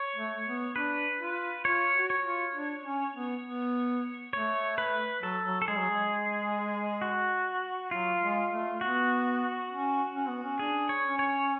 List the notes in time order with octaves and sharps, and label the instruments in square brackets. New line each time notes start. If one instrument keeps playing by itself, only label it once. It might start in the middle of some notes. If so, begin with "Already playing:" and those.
Already playing: [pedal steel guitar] C#5
[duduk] A3
B3
[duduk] D4 [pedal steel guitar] B4
[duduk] F4
[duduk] F4 [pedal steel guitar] C#5
[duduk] F#4
[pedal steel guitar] C#5
[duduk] F4
D4
C#4
B3
B3
[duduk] A3 [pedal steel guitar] C#5
[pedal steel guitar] B4
[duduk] F#3 [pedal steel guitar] A4
[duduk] F#3
[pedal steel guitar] A4
[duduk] G#3 [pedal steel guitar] G#4
[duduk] F#3
G#3
[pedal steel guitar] F#4
[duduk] F#3 [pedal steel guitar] F4
[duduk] G#3
A3
[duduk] B3 [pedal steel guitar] F#4
[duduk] C#4
C#4
B3
C#4
[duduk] D4 [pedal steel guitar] G#4
[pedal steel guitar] C#5
[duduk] C#4
[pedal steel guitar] C#5